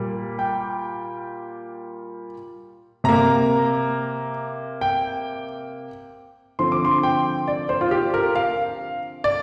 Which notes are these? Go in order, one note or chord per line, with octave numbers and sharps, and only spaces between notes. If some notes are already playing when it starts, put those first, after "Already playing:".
Already playing: A#2 G3 A#3
G5
C3 A#3 A#5
G5
D3 F3 C4 C6
D6
C6
G5
D5
C5
F4
G4
A#4
F5
D5